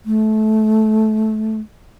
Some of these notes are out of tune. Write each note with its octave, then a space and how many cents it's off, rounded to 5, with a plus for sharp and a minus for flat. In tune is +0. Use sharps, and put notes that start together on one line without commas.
A3 -20